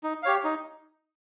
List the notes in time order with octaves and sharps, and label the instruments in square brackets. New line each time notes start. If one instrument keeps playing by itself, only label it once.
[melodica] D#4
G4 C#5 F5
D#4